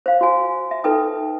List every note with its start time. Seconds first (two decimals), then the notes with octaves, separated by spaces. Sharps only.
0.06 C5 F5
0.21 F#4 G#5
0.71 E5
0.84 D#4 A4 B4 G5 D#6